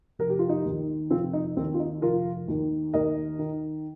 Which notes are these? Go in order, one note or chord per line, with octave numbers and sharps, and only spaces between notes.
F1 A#4
G4
F4
D#4 G4
D#2 D#3
F1 C4 F4
D#4
D#2 D#3 C4
F4
D#4
F1 F4 A#4
D#2 D#3
D#2 A#4 D#5
D#3